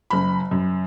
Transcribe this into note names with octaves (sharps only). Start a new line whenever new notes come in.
F#1 B5
F#2